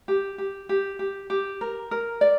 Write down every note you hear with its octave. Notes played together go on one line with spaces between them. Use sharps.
G4
G4
G4
G4
G4
A#4
A#4
D5